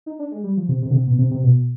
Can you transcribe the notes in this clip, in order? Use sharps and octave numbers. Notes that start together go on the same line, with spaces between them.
D#4
D4
G#3
G3
F3
C3
C3
D3
C3
B2
C3
C3
B2